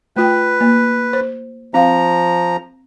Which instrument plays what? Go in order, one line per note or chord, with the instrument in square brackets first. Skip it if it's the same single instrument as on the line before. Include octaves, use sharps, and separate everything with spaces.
[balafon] A3 F4 G5 [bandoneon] B4
[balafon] A#3
C5
[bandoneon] F3 A#5 [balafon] C4 F5